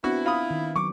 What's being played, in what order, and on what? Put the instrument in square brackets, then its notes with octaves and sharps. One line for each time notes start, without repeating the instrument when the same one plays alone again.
[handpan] B3 C4 D4 [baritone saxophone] E4 [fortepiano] F#4
[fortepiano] F4 B5 D#6
[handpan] D#3
[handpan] F#3 [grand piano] C#6 D6